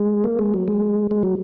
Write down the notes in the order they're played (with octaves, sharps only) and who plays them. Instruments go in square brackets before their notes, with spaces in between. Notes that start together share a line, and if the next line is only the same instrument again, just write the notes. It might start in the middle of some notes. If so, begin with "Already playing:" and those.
Already playing: [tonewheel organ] G#3
A#3
G#3
F#3
G#3
G#3
F#3